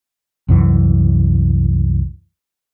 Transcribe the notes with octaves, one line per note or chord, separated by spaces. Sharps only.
C2 F#2 E3